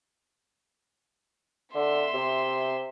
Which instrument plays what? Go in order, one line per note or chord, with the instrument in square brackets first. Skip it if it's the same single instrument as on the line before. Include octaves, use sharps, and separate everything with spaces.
[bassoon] D3 [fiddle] E5 C6
[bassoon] C3